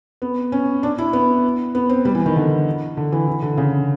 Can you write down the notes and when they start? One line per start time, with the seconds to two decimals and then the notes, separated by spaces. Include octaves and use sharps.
0.22 B3
0.52 C#4
0.83 D4
0.98 E4
1.13 B3
1.75 B3
1.89 C4
2.05 G3
2.15 E3
2.26 D#3
2.36 D3
2.97 D3
3.12 E3
3.27 E3
3.42 D3
3.57 C#3